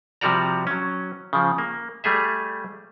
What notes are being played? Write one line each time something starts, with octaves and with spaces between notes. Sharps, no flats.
C3 F3 G3 F#4 D5 A#5
F#3 C#4
C#3 F3
A#3
G3 A3 G#4 E5